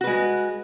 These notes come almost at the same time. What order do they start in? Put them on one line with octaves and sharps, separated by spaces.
F#4 B4 G#3